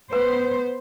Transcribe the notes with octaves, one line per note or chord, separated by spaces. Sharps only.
B3 B4 C5